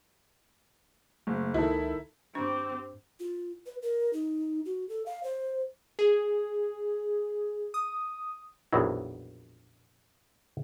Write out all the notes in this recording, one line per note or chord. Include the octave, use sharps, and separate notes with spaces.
F#1 A3
C#2 D#3 E4 A4
G2 C4 D4 G4 C#6
F4
B4
A#4
D#4
F#4
A4
F5
C5
G#4
D#6
A#1 F2 B2 D#3 E3 F#3